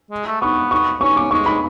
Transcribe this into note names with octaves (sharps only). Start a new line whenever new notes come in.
G#3
A3
B3 C#6
C#6
C#4 C#6
D6
G#3 C#6
B5